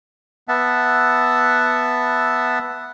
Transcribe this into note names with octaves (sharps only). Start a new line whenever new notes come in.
B3 E5 F#5 A5